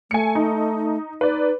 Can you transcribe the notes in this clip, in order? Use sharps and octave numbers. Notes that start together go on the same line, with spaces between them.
A3 G#5 C#7
D#4
D#4 B4 D5